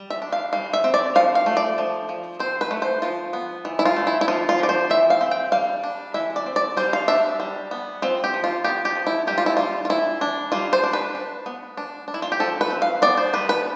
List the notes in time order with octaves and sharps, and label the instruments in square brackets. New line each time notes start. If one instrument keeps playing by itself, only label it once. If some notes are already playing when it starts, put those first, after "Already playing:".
Already playing: [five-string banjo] G3
E5
D4
F5
G3 F5
E5
C4
D5
F3 F5
F5
A3
D5
F3
F3
C4 C5
B4
A3
C5
F3 F4
B3
E3
E4
F4
A3
E4
E4
F3 F4
F4
F3 D5
C5
E3 E5
F5
C4
G5
G3 F5
D4
E3 E5
D5
C4
D5
G3 C5
F5
D4 E5
G3
B3
C4 F4
G4
F3
F4
B3 G4
G4
F3
E4
G3 G4
F4
E4
G3 F4
F4
E3 E4
D4
G3 F4
C5
D4
B4
D4
B3
D4
D4
E4
F4
G4
F3 A4
B4
C4
F5
B3 D5
C5
G3 B4
B4